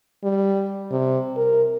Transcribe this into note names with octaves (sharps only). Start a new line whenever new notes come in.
G3
C3
A#4